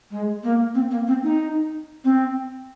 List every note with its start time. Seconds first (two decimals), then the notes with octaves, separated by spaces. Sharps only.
0.11 G#3
0.43 A#3
0.74 C4
0.91 A#3
1.07 C4
1.23 D#4
2.04 C4